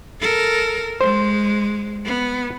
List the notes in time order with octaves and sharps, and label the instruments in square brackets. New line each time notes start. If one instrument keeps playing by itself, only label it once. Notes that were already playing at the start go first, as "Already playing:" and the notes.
[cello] A4 A#4
[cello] G#3 [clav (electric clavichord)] C5
[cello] B3